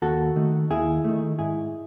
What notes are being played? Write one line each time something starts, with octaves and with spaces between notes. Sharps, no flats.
D#2 F#4 A4
D#3 A3
D#2 E4 G#4
D#3 A3
G#2 E4 G#4